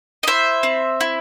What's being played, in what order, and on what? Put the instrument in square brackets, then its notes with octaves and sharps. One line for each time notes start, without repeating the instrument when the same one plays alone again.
[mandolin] D#5
E4 C5 E5
C4
E4